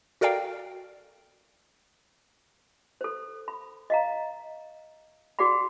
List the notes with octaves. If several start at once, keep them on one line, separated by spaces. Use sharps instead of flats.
F#4 A4 A#4 D5 F5 G5
A4 C5
B5
D#5 F5 A#5
F#4 G#4 D5 F#5 B5